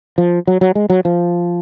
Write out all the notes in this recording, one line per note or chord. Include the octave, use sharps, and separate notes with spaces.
F3
F#3
F#3
G#3
F#3
F3